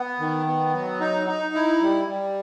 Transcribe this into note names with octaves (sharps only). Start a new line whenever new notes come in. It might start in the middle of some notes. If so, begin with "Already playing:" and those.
Already playing: B3
D#3
B3
F#3
D#4
D#4
E4
G3
G3